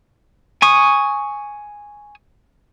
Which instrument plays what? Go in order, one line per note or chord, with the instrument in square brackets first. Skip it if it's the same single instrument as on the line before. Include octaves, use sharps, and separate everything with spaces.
[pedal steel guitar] G#5 C#6 D#6